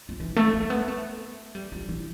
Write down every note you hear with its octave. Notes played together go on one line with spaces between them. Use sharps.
F3
E3
A3
A3
B3
A3
G3
F3
E3